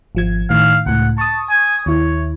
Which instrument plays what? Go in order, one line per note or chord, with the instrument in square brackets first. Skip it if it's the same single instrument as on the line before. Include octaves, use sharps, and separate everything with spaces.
[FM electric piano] G#1 F3 G#6
[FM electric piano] A2 D#3 [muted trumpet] F5
[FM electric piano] C#2 A2 [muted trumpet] F#5
[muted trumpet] A5 [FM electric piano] C#6 D#6
[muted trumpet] G#5
[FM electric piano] D#2 E4 [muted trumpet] C#5